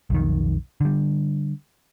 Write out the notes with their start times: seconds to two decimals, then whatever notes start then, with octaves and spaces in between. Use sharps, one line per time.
0.10 B1 F2 D#3
0.81 D3 G3